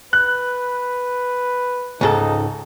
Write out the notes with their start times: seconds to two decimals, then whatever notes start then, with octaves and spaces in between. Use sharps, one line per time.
0.13 B4 F#6
2.01 C#2 G#2 D#4 A4